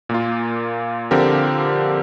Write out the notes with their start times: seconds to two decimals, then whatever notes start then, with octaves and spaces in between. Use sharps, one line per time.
0.09 A#2 A#3 F4
1.11 D3 F3 C4 G4 A#4